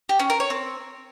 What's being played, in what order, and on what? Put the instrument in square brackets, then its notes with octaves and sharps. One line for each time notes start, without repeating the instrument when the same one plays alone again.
[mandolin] G4
C#4
A#4
C#5
C4